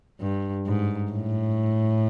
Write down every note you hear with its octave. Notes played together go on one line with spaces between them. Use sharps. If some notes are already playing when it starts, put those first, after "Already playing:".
G2
G#2
A2